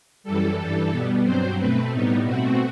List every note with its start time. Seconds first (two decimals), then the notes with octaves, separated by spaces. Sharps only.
0.24 F#2 E3 G3 A4
0.57 G2 E3 G3
0.91 B2 G3 B3
1.24 G2 F#3 C4 C5
1.58 B2 A3 C4 B4
1.91 A2 G3 B3 D#4
2.24 B2 A3 C4 F#4